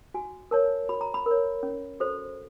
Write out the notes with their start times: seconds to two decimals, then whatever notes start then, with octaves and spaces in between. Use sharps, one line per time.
0.14 F#4 G#5
0.51 A#4 C#5 A5
0.89 F#4 B5
1.01 A#5
1.14 B5
1.26 A#4 C#5
1.63 C#4
2.00 F#4 A4 C5